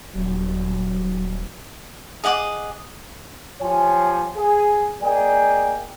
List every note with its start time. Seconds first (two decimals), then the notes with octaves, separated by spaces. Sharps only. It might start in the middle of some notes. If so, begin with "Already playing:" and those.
0.15 D#1 F#3
2.24 G#4 D#5 F#5 D6
3.61 F3 F4 G4 C#5 G#5
4.36 G#4
5.02 G#3 A#3 G#4 D5 G5 G#5